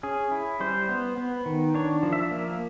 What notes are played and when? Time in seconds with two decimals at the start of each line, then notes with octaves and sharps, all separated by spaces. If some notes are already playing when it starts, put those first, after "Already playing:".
0.03 C#4 G#4
0.31 E4
0.60 G3 C5
0.89 B3
1.18 B3
1.46 D#3
1.74 D4 C#5
2.03 F3
2.13 E5
2.31 A#3